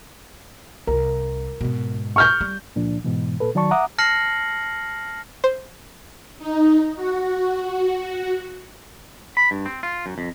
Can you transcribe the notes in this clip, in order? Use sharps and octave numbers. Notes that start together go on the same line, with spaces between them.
C2 A#4
G#2 B2
C#6 F6 G6
G3
C#2 A#2 F3 D4
G#2 B2 E3
A#2 A4 B4
D#3 F#3 D5 A5 C#6
E5 F#5 A#5 D6 D#6
A5 F6 A#6 C7 C#7 F#7
C5
D#4
F#4
B5
G2
C4
F4
F#2
F2